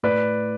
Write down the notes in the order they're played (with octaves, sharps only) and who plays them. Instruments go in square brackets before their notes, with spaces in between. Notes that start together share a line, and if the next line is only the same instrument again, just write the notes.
[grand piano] A2 B4 D5